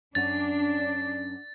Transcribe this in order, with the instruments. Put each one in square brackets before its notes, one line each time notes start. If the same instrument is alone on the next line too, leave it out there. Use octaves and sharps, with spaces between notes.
[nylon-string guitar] F#2 C#4 F#5 [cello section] D4 [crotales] A6